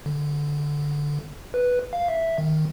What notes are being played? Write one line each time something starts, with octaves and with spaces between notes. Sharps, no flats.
D3
B4
F5
E5
D#3